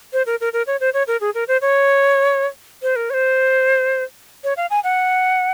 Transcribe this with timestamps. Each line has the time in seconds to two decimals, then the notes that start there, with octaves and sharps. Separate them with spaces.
0.13 C5
0.26 A#4
0.41 A#4
0.53 A#4
0.67 C#5
0.80 C5
0.93 C#5
1.07 A#4
1.21 G#4
1.34 A#4
1.48 C5
1.61 C#5
2.82 C5
2.96 A#4
3.10 C#5
3.14 C5
4.44 C#5
4.57 F5
4.70 G#5
4.84 F#5